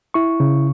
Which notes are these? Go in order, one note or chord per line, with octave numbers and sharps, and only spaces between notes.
E4 C#6
C#3